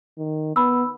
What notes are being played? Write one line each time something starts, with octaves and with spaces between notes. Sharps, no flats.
D#3
B3 B5 E6